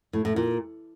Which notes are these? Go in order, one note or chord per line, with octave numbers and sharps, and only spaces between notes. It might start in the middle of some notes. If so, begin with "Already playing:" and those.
A2
A2
A#2